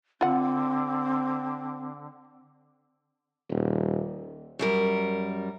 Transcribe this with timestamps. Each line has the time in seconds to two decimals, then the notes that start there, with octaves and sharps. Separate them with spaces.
0.21 D3 C4 F4 F#5
3.51 D#1
4.59 F#2 G3 A#4